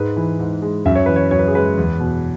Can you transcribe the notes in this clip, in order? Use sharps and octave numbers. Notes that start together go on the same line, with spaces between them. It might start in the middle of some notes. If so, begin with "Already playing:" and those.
Already playing: G#2 G#3 B4
E3
G#2
G#3
F#2 E5
C#5
E3 B4
C#5
F#2 C#5
B4
G#4
G#3 B4
E2
B2